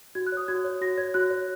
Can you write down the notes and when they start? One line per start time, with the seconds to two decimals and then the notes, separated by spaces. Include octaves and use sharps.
0.15 F#4 G#6
0.27 F#6
0.32 C#5 D#6
0.48 F#4 G#6
0.64 C#5
0.81 F#4 A#6
0.98 C#5 G#6
1.14 F#4 F#6
1.30 C#5